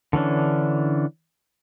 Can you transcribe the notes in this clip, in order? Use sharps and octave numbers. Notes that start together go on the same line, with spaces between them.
D3 E3 C#4 D4